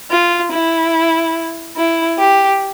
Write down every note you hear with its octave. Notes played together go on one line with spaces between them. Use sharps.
F4
E4
E4
G4